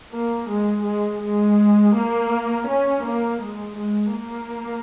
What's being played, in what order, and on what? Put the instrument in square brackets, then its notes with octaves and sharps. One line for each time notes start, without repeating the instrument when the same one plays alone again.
[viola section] A#3
G#3
G#3
G#3
A#3
C#4
A#3
G#3
G#3
A#3